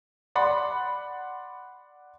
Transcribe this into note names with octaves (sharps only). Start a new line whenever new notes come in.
D5 F#5 B5 C6